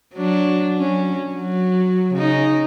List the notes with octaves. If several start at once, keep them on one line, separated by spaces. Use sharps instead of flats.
F#3 D4
F#3 C#4
F#3
C#3 D#4